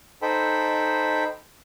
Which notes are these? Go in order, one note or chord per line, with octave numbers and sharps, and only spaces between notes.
D#4 A4 C5 G5 B5